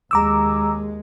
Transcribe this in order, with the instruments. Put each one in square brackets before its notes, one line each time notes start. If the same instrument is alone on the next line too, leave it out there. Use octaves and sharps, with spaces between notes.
[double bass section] D#2 G#3 [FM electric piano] A#5 D6 E6